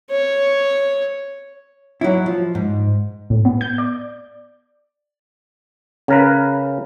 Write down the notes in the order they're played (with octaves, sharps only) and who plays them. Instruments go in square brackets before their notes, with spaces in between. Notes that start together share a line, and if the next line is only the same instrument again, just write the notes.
[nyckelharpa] C#5
[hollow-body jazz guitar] F#3 E4
F3
G#2
[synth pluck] A2
B3
G6
D5
[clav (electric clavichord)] C#3 A#4 B4